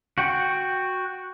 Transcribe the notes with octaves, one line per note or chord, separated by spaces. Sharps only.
F#4 F#5 G5